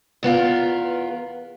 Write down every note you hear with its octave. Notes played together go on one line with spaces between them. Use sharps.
E2 B3 F4 A#4